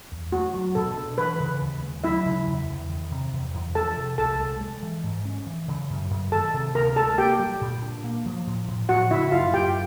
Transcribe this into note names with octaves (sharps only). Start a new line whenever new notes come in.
E2
A3 F#4
F#3
B2 A4
D4
E3 B4
C#3
D#2
G#3
F#3 E4 E5
C#3
E2
E2
D#3
C3
E2
E2
F3 A4 A5
C3
C2 A4 A5
G#3
G#3
E3
G#2
C#4
E3
C#3
F#2
F#2
D#3 A4 A5
C3
D2 A#4 A#5
G#3 A4 A5
A#3 G4 G5
G3
A#2
D4
A#3
F3
A2
A2
F3 F#4 F#5
C#3 E4 E5
F#2 F4 F5
F#2 G4 G5